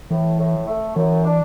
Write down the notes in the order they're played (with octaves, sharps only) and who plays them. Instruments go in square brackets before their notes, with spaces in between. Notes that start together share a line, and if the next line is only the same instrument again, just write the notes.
[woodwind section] A2 [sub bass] E3
[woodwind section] A2
A3
[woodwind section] F#2 [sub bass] E3
[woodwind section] D4